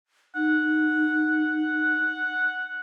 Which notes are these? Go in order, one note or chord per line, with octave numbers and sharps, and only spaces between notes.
D#4 F#5